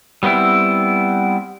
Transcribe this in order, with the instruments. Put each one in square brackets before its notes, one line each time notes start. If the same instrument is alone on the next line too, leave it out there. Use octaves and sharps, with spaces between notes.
[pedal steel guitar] G3 B3 C4 E4